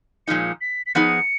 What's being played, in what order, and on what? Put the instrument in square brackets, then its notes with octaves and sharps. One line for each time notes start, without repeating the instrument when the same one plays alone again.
[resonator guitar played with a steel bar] A#2 F3 G#3 D#4 [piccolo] C#7
[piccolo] B6
B6
[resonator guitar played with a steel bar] F3 B3 D#4 G#4 [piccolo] C#7